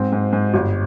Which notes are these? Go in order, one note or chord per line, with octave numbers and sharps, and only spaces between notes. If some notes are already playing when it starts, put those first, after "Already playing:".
Already playing: G#2 C4
G#2
G#2
G1